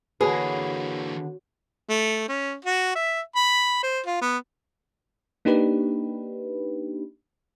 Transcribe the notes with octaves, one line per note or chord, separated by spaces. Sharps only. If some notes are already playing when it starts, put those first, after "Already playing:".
D3 E3 A#3 F#4 G#4 B4 C#5
A3
C#4
F#4
E5
B5
C5
F4
B3
A#3 D4 D#4 G4 B4